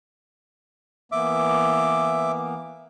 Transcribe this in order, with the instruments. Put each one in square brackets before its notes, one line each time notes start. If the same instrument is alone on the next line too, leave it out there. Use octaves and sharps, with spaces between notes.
[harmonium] E3 A#3 B3 [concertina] E5 D6